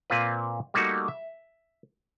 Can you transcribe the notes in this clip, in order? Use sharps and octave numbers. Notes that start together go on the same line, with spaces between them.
A#2 A#3 C4 F4 B4
G3 A3 A#3 D#4 F#4
E5